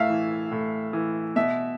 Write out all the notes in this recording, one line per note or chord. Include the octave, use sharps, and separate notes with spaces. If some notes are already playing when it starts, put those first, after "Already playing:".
Already playing: A2 E5 F5
E3
A2
E3
B2 E5